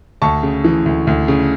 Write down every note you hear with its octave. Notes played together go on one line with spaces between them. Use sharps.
D2 A5 C#6
C#3
E3
D2
D2
C#3